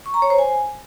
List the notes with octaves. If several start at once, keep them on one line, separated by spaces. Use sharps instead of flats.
C#6
A#5
C#5
C5
G#5